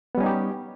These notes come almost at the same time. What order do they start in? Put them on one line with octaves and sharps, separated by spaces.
B3 G3 C#4 D#4 G4